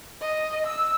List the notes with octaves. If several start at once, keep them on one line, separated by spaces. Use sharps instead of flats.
D#5
E6